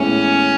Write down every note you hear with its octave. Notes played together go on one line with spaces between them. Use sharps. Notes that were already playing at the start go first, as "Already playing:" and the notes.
Already playing: A2 E3 G#3 B3 C#4 E4